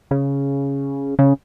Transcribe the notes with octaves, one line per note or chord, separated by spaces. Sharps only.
C#3
C#3